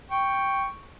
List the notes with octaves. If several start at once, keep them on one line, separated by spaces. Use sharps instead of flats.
G5 C#6